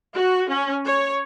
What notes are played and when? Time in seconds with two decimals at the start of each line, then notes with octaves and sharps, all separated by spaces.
0.14 F#4
0.49 C#4
0.83 C#5